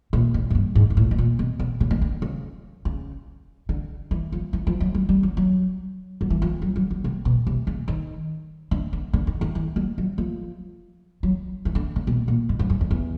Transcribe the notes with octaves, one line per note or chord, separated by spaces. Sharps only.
A#2
A2
G#2
G2
G#2
G#2
A2
B2
A#2
B2
B2
C#3
D3
D3
C#3
C#3
D3
E3
F3
E3
F3
F#3
F#3
G3
F#3
F#3
F#3
E3
F3
F#3
F#3
F#3
C3
B2
C3
C#3
D#3
D3
D3
D3
D#3
D#3
E3
F#3
F#3
F3
F#3
E3
D3
C#3
B2
A#2
G#2
G2
F#2
F2
E2